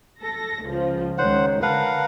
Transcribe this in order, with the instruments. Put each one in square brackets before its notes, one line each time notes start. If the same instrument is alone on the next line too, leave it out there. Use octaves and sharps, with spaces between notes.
[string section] A4 A#6
C#2 F3
[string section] C#2 D#3 [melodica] C5 F#5 [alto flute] C#5
[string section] D3 A#4 [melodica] B4 F5 F#5 [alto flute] A5